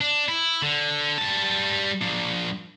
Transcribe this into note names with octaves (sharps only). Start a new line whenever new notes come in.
D4
E4
D3
G3 A5
F3 D4